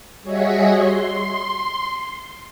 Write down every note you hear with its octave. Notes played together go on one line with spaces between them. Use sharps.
G3 F#4 G#4 C#5 D#5 E5
C6